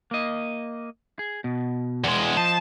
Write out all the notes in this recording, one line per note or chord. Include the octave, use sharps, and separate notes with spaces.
A#3 D#5
G#4
B2
E2 G#3
F3 C5 D#5 A5